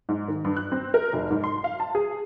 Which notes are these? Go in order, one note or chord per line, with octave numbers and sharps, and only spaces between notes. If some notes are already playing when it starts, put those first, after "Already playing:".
G#2
D#3
G2
F#6
C4
A#4
F1
G#2
C6
F5
A5
G#4